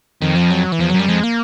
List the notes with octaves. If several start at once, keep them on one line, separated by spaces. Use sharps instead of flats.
F2 D#3
F3
F#3
E3
E2 F3
F#3
F#2
G3
F2 G#3
A#3